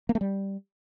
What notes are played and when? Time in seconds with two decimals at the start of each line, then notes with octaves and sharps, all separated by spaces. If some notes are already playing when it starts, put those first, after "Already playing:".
0.09 A#3
0.15 A3
0.21 G3